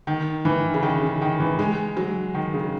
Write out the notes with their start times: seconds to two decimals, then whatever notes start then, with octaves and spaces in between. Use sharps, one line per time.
0.07 D#3
0.45 E3
0.74 C#3
0.83 D#3
1.01 C#3
1.21 D#3
1.40 E3
1.59 G#3
1.97 F#3
2.34 D#3
2.54 C#3